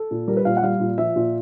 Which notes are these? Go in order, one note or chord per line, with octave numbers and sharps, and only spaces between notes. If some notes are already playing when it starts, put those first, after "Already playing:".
Already playing: A4
A#2
G3 A#4
B4
A#2 F5
F#5
G3 F5
A#2
F3 E5
A#2